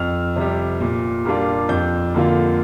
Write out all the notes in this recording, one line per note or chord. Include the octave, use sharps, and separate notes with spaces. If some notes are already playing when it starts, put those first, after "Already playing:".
Already playing: F2 F6
C3 G3
A#2
G3 A#3 D4 F4
F2 G6
D3 A#3 F4